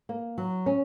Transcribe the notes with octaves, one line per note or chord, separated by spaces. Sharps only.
A#3
F#3
C#4